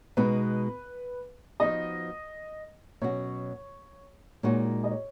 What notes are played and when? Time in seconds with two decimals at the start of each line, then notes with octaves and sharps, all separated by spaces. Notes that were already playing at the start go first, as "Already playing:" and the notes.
0.17 B2 G#3 B3 D#4 B4
1.60 F3 B3 D#4 F#4 D#5
3.02 B2 F#3 C#4 F#4 C#5
4.43 A#2 G#3 D#4 F#4 C#5
4.84 D#5
4.91 C#5